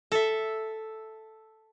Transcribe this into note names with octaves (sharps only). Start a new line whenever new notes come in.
A4 E5